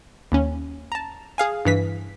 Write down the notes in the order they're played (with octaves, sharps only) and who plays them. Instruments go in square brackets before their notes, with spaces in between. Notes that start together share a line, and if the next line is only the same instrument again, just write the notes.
[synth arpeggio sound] D#2 C#4
A5 A#5
G#4 F5 G#5
G2 E3 B6